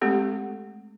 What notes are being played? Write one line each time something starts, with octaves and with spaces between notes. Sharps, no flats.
G#3 A3 C4 G4 A4